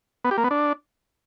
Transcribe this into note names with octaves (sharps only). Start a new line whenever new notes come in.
B3
G4
A#3
B3
D4